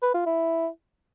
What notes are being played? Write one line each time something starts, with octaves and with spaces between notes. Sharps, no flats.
B4
F4
E4